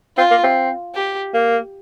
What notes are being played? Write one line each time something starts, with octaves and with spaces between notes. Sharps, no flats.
C4 F4
A#3
C4
G4
A#3